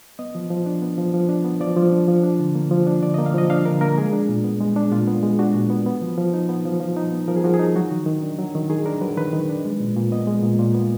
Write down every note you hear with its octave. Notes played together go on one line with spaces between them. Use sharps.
B3 D#5
F3
F3
D4
B3
F3
F3
D4
B3
F3 D5
F3
D4
F3
D4
D3
A#3
F3
D4
D3 D5
A#3 D#5
F5
F3 D#5
D4 F5
D3 A#4
A#3 A#4
G#3 G#4
D4
A#2
B3
G#3
D4
A#2 F4
B3
G#3
D4 F#4
A#2
B3
B3
F3
F3
D#4
B3
F3
F3
D#4
B3
F3 A#4
G#4
F3 F#4
G#4
D#4
F#3 F#4
D#3
D#3
D4
F#3
D#3
D#3 G#4
D4 A#4
F#3 B4
D#3 B4
D#3
D4
G#3
A#2
A#2
B3 D#5
G#3
A#2
A#2
B3